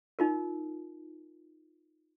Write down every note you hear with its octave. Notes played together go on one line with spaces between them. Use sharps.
D#4 F4 A#4